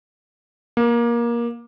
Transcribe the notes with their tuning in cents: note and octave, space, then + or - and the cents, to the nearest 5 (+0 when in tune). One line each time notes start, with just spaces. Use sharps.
A#3 +20